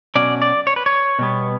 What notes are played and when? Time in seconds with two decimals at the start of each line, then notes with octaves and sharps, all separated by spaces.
0.15 B2 F#3 C#4 D5
0.42 D5
0.67 C#5
0.76 B4
0.86 C#5
1.19 B2 G3 B3